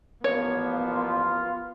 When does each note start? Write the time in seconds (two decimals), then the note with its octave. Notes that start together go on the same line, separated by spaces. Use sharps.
0.24 A1 F3 A#3 B3 C#5
0.89 F4